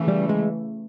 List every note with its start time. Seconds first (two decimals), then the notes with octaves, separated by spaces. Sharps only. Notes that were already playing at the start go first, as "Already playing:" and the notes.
Already playing: C#3 E3 A3
0.08 G3
0.29 G#3